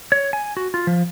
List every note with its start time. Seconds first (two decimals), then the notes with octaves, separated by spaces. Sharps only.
0.12 C#5
0.33 G#5
0.57 F#4
0.74 F4
0.87 F3